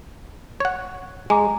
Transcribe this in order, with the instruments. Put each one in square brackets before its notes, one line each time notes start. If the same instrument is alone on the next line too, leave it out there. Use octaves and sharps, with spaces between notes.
[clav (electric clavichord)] C#5 F#5
[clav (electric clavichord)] G#3 [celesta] G#5 A#5 D6